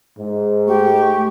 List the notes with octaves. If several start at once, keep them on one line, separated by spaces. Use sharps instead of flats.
G#2
A3 G4 C#6